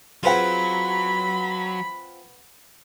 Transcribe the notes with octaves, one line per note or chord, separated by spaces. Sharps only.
F#3 C4 F4 G#4 B4 F#5 B5